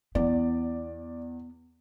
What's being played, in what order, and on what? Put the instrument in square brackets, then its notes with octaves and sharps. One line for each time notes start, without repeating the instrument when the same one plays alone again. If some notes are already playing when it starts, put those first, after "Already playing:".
[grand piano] E2 [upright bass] B3 [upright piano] D5